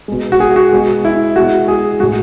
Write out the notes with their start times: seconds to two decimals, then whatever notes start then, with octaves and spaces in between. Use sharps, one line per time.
0.08 B2 G#3
0.32 F#4
0.40 G#4
0.56 F#4
0.72 B2 G#3
1.05 E4
1.36 B2 G#3 F#4
1.68 G#4
2.00 A2 G#3 F#4